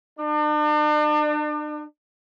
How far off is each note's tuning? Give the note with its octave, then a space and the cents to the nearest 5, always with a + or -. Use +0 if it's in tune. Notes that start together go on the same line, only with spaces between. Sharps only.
D4 +40